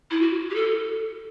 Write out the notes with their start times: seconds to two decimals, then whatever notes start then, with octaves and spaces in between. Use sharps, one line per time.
0.11 E4
0.21 F#4
0.50 G4
0.55 A4